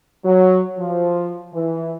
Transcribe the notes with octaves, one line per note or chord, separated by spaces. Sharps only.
F#3
F3
E3